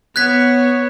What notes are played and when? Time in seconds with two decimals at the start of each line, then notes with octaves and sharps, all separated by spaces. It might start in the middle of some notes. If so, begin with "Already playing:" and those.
0.16 B3 C#5 F#6 G#6 B6